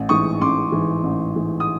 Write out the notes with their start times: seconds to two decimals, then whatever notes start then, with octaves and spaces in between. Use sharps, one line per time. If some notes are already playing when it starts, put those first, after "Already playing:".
Already playing: A1
0.09 G#2 E3 C#6 D#6
0.41 A1 C6 D6
0.72 G#2 E3
1.04 A1
1.35 G#2 E3
1.60 D#6